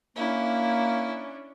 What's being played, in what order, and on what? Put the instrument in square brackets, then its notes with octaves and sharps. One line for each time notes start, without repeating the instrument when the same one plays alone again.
[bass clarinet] A#3 [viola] C#4 D4 [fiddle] E4